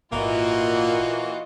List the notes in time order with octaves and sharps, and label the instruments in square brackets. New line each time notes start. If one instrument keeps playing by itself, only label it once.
[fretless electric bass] G#1 [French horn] A#2 [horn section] E3 A#3 F#4 [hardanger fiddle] F4 D#5